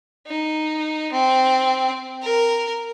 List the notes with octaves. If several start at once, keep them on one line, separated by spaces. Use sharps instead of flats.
D#4
C4
A#4